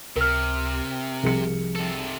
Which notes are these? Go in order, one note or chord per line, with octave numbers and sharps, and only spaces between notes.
C#2 C3 A#4 F6
C2 F3 G#4 C#7
C3 A4